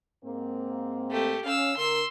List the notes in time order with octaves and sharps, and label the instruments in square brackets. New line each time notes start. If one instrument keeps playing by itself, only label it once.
[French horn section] G#2 A#3 C4
[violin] A3 G4
[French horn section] C#4 [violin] F5 E6
[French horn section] D3 A#4 [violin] C6 E6